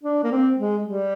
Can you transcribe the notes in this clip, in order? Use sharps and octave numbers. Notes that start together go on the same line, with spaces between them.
D4
A#3
C4
G#3
G3